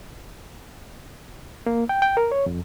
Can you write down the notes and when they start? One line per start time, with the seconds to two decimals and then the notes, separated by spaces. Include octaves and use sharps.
1.66 A#3
1.89 G5
2.02 G5
2.17 A#4
2.31 C#5
2.46 F2